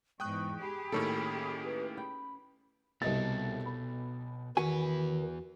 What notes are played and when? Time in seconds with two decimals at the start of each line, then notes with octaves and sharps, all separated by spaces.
0.20 E2 G#2 G5 C#6 D#6 F#6
0.62 G4 G#4 B5
0.92 A2 D#3 A#3 C#4 A4
1.65 B4
1.97 G5 B5
3.02 C2 B2 A4 D#5 A6
3.66 B5
4.57 E2 D#3 F#4 B4 G#5